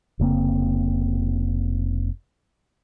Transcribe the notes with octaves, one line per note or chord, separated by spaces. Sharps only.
F1 C#3 A#3 C4